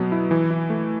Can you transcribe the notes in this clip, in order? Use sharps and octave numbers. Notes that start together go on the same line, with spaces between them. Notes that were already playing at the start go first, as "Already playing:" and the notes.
Already playing: B2 F#3 B3
E4
E3
E4
A3